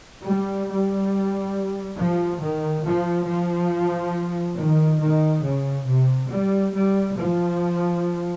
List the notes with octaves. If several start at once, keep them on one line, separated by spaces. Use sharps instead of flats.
G3
G3
F3
D#3
F3
F3
D#3
D#3
C#3
C3
G3
G3
F3